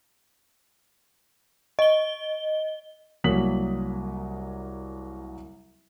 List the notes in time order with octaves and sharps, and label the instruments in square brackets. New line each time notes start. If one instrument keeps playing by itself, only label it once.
[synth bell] D#5 G7
[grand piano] C2 F#3 A#3 D#6 B6 F#7